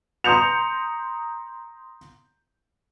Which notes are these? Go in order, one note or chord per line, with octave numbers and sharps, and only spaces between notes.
A#5 C6 D#6 G6 C#7 F7